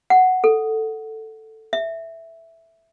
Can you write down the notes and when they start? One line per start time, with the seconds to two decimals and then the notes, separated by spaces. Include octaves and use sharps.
0.10 F#5
0.44 A4
1.73 E5